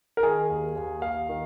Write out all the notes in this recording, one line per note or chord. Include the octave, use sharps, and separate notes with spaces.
A#4
D#3 G#4
D#2
D#2
D#2 F5
D#3